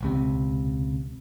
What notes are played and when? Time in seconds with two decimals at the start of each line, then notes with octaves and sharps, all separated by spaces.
0.01 E1 C#2 C3